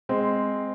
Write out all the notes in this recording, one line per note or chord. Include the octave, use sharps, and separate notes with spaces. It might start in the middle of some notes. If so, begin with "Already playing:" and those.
G#3 C4